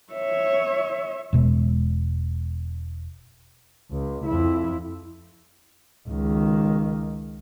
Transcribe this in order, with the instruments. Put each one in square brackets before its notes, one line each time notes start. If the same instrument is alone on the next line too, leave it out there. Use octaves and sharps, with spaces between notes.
[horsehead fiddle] C#5 E5
[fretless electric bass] E1 B2 G#3
[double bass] C#2
F2 E4
C#2 D#3